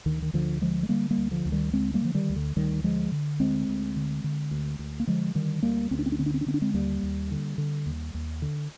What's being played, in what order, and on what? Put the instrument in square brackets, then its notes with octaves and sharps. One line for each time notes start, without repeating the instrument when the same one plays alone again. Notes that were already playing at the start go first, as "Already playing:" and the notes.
[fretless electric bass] D2 D#3
D#3
D2 D3 F3
D3 F3 G#3
G#3
D3 G3 A#3
G3 A#3
D2
D3 F3
D2
D#3 G3
D3 G#3 C4
G3 A#3
D3 F3
D#3 G3
D2
D3
D2 D#3 G3
D3 F3 G#3
D3
D2 G#3 C4
D2
D3
D3
D2
D2
A#3
D3 F3 G#3
D3 D#3 G3
D2 G3 A#3
D2 C4
D4
C4
D4
D3 C4
D4
C4
D4
D3 C4
D4
G#3 C4
D#2 G3 A#3
D#2
D3
D3
D#2
D#2
D3